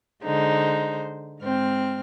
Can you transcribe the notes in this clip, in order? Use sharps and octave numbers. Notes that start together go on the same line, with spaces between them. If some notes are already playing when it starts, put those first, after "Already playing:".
D3 G#3 D#4 C5
G#2 C4 F6